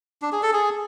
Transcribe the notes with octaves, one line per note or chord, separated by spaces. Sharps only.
D4
G#4
A4
G#4